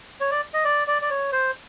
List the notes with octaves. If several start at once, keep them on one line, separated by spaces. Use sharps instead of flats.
C#5
D5
D#5
D5
D5
D5
C#5
C5